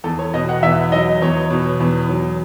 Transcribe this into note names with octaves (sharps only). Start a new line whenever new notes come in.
E2 A4
C#5
B2 D#5
F#5
E2 E5
F#3 D#5
E2 C#5
B2
E2
F#3